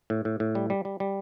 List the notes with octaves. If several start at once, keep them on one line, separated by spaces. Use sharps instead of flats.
A2
A2
A2
G3
G3
G3
G3